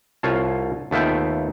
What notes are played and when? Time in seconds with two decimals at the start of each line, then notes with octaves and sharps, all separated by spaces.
0.23 C2 F4 C#5 F5 A5
0.91 D#2 A3 B3 F4 E5 G5